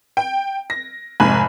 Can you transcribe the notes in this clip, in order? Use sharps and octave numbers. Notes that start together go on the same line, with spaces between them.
G5
A#6
F1 G#2 G#5 B5 F#6